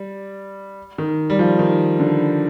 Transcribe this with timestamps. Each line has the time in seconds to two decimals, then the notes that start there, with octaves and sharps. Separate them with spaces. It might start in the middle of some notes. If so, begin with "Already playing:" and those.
Already playing: G3
0.98 D#3
1.30 G3
1.39 F3
1.59 D#3
1.99 D3